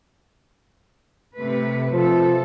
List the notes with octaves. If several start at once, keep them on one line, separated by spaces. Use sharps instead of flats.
C3 A3 B4
C3 F3 A4